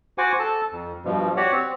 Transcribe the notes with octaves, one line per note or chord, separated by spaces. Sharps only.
F#4 C5 F#5 G#5 D6
A4 A5
F2
G2 B2 F3
F#4 G4 C#5 D5 F#5
C4